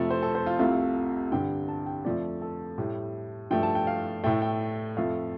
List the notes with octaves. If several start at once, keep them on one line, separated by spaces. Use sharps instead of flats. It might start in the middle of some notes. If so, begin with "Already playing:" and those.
Already playing: F2 C3 F3 A3
C5
A4
C5
F4
C2 C3 A3 F4
G2 D3 G3 G5
A5
G5
F2 F3 A3 D5
A4
A2 G3
G2 F3 A3 G5
A5
G5
F5
A2 A3 G5
G5
F2 F3 A3 F5